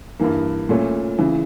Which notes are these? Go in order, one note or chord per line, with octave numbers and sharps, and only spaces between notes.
G2 E3 A#3
A#2 A3 C#4
C#3 E3